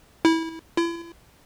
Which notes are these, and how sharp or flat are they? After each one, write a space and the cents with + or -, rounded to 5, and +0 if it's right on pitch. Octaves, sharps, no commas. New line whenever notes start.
E4 -20
E4 +40